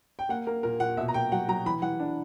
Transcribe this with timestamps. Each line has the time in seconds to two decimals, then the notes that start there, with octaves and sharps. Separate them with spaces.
0.19 G5
0.29 A#3 F#5
0.47 A#3 A#4
0.63 A#2 A#4
0.80 A#2 F#5
0.97 B2 E5
1.08 A#5
1.14 A#3 G5
1.32 F#3 F#5
1.48 F#3 A#5
1.66 E3 B5
1.82 E3 F#5
2.00 D4